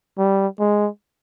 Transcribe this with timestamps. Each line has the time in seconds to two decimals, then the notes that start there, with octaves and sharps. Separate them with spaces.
0.18 G3
0.59 G#3